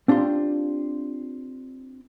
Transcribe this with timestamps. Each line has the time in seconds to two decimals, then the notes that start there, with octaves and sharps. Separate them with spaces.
0.08 C4 D4 F4 G4 C6